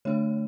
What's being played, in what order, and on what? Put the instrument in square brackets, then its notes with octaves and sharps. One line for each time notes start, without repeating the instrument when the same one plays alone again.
[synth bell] D3 A3 D4 C#5